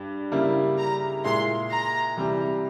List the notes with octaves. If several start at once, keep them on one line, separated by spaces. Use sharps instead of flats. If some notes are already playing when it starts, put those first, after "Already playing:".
Already playing: G2 G3
C#3 G3 A#3 E4
A#5
A#2 G#3 E4 C6
A#5
C3 E3 G3